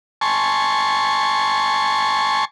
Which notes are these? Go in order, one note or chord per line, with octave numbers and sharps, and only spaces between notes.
G#5 A5 C6 C#6